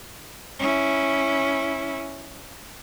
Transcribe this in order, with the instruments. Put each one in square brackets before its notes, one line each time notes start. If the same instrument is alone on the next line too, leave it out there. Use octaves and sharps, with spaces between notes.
[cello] C#4 E4